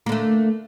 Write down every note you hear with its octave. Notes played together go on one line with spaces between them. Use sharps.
D3 A3 A#3